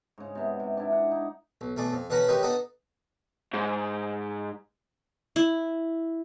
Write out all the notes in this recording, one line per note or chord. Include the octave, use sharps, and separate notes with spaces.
G#2 C#3
C3 B3
C3
D4 E4
F#5
D#4
B1
B1 A3 G#4 D5
F2
B2 D3 C#4 B4 F#5 A#5
D#3 G#3 D#4 G4 B4 C#5
B3 D4 D#4 F#4 A4
G#2
E4